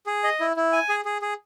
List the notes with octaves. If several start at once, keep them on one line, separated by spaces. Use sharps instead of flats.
G#4
D#5
E4
E4
G#5
G#4
G#4
G#4